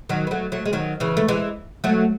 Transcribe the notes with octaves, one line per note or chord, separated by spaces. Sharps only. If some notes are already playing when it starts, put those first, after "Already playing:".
D#3 F#3
B3
F#3 A3
F#3 A3
G#3
D#3 F#3
C#3 E3
A3
E3 G#3
F#3 A3